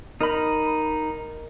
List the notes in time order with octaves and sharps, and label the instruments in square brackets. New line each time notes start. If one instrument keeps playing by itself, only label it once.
[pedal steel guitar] D#4 B5 [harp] A#4 D#5